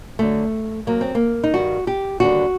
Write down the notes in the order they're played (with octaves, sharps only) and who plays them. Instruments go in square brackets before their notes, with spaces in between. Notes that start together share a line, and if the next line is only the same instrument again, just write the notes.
[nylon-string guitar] D2 D3 F#3 A3
F#2 F#3 A#3
C4
A#3
D#4
G2 D#3 G3 F#4
G4
D#2 D3 G3 F#4